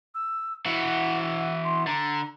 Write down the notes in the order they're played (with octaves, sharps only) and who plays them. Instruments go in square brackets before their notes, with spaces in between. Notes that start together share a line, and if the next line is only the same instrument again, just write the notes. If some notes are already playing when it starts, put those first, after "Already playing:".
[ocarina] E6
[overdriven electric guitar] E3 F#4 [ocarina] F#5
[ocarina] C6
[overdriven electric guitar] D3 [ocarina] A#5